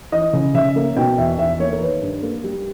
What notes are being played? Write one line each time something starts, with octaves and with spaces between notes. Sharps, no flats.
E3 D#5
C#3
C#3 E5
A#3
B2 G5
E2 E5
E2 E5
A#3 C#5
A#4
D#3 B4
G2
A#3
G3